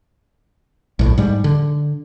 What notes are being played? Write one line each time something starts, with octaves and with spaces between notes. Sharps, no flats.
A#1 A2
G#2 G3
D3